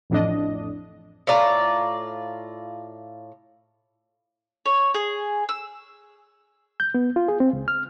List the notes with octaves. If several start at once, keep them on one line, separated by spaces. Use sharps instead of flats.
A1 F2 A2 D4 D#5
A2 F4 D5 A#5
C#5
G#4
E6
G6
B3
F4
G#4
C4
C#2
F6